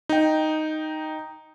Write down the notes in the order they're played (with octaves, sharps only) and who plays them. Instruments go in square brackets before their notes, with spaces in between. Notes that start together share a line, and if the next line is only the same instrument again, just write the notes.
[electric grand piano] D#4 G5